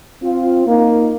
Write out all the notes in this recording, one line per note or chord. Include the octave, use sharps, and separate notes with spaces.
C4 F4
A#3 D#4